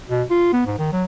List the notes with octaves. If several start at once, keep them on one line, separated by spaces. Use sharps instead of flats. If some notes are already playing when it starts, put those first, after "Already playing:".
B2
F4
B3
G#2
D#3
F#3